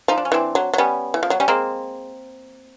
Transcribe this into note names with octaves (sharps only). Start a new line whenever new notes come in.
F3 D#4
D4
C#4
E3 C4 D4
F#3
F#3
G3 B3 C#4
E3
F3
F#3
G3 C#4
G#3 A#3 C4